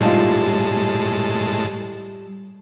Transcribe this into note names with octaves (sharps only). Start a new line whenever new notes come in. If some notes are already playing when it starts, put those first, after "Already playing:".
A2 G3 G#3 D#4 F4 A5